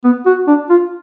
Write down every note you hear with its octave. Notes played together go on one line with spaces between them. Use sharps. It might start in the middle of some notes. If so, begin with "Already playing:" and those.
B3
F#4
D4
F4